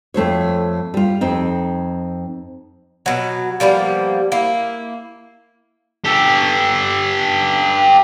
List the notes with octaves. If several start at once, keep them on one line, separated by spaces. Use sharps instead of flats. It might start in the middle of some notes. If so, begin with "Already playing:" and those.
F2 A3 C5 C#5
G3 F4
F2 C4 D#4
B2 F#3
F3 G3 A#3 B3
A#3 E4
G4 A4